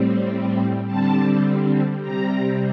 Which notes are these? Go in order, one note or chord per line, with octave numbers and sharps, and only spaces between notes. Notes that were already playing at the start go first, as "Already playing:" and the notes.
Already playing: A2 G3 C4
D3 G3 C4 A5
C3 G3 C4 A#5